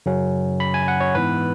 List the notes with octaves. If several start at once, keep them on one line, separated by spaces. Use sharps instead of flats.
F#2 C#3 F#3 C#4
B5
G#5
F#5
C#5
G#2 E3 B3 B4